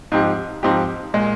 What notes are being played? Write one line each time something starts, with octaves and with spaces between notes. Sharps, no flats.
G#2 F3 C4 D#4 G4
G#2 F3 C4 D#4 G4
A#2 G#3